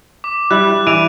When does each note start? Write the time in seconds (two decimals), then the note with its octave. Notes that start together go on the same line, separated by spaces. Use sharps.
0.24 D6
0.51 G3 E4 F#6
0.87 E3 D7 D#7 F7